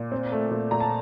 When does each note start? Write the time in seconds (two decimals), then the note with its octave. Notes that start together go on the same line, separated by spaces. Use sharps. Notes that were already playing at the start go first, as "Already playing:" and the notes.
Already playing: A#2
0.12 C4
0.32 A3
0.51 A#2
0.71 A#2 A#5
0.80 A5